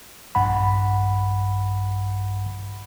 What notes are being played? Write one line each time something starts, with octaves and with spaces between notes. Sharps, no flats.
A#1 G2 F#5 B5